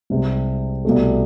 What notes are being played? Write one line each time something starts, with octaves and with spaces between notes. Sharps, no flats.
C2 C3 G#3
C2 B2 A3